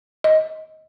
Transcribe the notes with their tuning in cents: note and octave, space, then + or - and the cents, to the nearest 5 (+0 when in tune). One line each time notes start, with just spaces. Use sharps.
D#5 +20